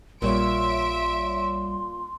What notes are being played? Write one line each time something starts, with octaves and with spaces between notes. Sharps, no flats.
A#1 A#2 G3 C#5 E5 C6 D7